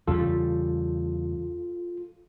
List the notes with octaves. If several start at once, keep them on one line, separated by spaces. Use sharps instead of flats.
E2 C#3 G3 F4 A4